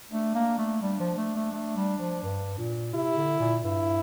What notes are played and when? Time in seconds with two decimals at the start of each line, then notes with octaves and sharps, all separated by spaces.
0.12 A3 D4
0.35 A#3
0.58 A3
0.82 G3 D4
1.00 F3
1.17 A3
1.35 A3
1.52 A3
1.76 G3
1.99 F3
2.23 G2
2.58 A#2
2.94 C3 E4
3.17 D3
3.40 A#2
3.64 G2 E4